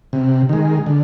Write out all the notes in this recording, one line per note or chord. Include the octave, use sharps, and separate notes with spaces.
C3
D#3 G#3
D3